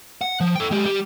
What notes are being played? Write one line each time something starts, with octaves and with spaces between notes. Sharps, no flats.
F#5
F3
A4 G5
G#3 G4
G3 G4